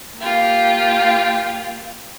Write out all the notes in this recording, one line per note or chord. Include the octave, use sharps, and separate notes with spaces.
A#3 F4 G4